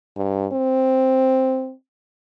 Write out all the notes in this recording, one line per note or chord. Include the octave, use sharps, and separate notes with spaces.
G2
C4